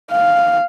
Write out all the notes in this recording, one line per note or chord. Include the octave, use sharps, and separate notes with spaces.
F5